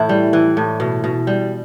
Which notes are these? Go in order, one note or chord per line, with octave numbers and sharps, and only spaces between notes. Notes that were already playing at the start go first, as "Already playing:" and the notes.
Already playing: A2 E3 E4
G3
E3
A2
B2
B2
G3